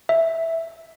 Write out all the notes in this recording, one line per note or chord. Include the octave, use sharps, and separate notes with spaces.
E5